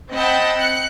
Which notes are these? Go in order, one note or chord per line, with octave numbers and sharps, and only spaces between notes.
C4 D#5 F#5 G5 A5 B5
F#6 C#7